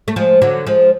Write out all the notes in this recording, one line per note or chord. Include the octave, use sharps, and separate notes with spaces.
A3
F3 G#3
D3 F#3
F3 G#3